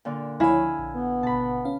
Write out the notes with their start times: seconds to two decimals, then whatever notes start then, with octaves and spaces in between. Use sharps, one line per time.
0.05 A#2 D3
0.40 C#2 F3 E4 C#5 F5 G#5 B5
0.79 A#1
0.94 B3
1.23 G#1 B2 A5 B5
1.65 C#4 F5